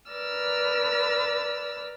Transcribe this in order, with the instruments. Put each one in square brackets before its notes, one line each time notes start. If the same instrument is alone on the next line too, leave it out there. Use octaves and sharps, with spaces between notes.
[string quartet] A#4 B4 D5 E6 F6